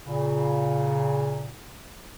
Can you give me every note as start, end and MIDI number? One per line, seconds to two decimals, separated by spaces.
0.06 1.51 46
0.06 1.51 49